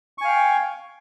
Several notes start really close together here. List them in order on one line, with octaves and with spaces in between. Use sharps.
C#6 G#5 F5 G5